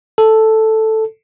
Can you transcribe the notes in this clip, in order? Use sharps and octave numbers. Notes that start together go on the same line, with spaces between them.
A4